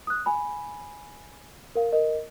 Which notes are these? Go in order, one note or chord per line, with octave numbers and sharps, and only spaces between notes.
D#6 F#6
G#5 B5
A#4 F5
A#4 D#5